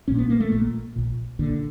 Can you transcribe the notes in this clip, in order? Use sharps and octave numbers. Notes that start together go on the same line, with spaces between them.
A#1 A#2 C#4
B3
A#3
A3
A#1 A#2
A#1 A#2
A#1 A#2 D3